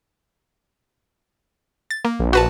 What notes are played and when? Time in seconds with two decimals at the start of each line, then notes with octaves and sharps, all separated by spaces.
1.91 A6
2.05 A#3
2.19 A#1
2.33 F#4 B4 A5